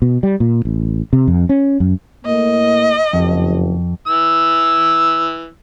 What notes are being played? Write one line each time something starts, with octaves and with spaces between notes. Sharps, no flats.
B2
G3
A#2
A1
C3
F2
C#4
F#2
A2 A#3 D#5
F#1 F2
E3 E6